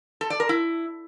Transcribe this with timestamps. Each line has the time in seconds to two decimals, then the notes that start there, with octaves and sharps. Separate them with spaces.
0.21 A4
0.30 D5
0.40 A#4
0.49 E4